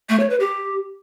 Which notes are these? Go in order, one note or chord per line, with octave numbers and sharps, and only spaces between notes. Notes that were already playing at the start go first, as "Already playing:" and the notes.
A3
C#5
B4
G4